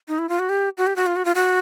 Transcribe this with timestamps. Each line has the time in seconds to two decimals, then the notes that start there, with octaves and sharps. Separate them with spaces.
0.08 D#4
0.19 E4
0.29 F4
0.39 F#4
0.49 G4
0.78 F#4
0.87 G4
0.96 F#4
1.06 F4
1.16 F#4
1.25 F4
1.35 F#4